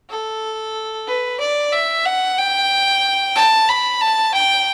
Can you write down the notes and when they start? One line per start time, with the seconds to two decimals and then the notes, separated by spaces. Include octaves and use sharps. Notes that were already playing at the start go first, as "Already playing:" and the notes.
0.10 A4
1.08 B4
1.40 D5
1.73 E5
2.05 F#5
2.38 G5
3.36 A5
3.69 B5
4.01 A5
4.34 G5